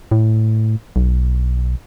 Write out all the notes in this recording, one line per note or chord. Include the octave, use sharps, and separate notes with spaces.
A2
B1